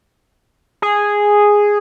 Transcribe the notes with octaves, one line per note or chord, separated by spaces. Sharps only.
G#4